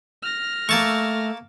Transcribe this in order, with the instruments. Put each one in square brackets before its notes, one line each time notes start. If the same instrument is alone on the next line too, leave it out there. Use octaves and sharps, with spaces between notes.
[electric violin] F6 A#6
[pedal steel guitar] A3 [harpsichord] A#3 A5 C#6